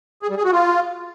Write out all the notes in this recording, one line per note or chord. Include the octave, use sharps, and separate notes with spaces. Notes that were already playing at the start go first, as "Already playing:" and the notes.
G#4
G3
G#4
F#4
F4